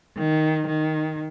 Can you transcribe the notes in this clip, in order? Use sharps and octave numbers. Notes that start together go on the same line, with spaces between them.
D#3
D#3